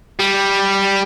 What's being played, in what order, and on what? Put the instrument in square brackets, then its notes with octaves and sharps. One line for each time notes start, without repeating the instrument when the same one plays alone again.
[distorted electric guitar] G3